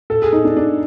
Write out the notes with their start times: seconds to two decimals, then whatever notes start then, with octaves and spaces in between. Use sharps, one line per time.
0.10 A4
0.22 G#4
0.33 D#4
0.45 D4
0.56 D4